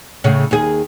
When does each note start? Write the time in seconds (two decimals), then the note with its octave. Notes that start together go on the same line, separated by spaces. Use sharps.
0.24 A2 C#3
0.51 D#2 G#4